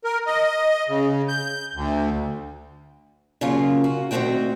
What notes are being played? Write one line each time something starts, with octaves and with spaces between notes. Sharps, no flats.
A#4
D#5
C#3
G6
D2
C#3 F#3 A#3 C#4 F4
F#4
D2 D#3 F3 C4 F#4 G5